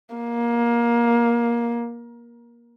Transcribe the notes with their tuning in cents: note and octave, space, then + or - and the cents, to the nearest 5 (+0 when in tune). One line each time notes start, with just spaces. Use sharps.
A#3 +20